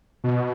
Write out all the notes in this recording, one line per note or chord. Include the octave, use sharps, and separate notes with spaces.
B2